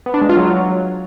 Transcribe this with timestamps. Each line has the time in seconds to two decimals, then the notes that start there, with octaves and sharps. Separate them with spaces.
0.06 B3
0.14 D4
0.22 G#3
0.29 F4
0.37 F#3